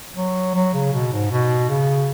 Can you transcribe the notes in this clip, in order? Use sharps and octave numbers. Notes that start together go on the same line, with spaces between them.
F#3
F#3
C#3
B2
G#2
B2
C#3